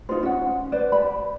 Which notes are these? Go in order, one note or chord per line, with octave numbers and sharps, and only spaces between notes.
D#4 F4 C5
C#4 F#5
B4 C5 D5
B5